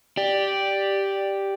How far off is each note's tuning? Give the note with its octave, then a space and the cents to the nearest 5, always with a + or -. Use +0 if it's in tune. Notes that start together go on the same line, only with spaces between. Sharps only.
G4 +0 D5 +0